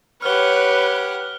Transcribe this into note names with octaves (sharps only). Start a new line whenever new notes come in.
G4 B4 C#5 F#5 F6 G7